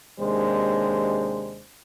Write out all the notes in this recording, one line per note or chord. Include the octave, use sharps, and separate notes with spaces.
D#2 C3 G#3 D4 C5